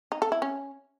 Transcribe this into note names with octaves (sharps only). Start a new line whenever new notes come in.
D#4
A4
E4
C#4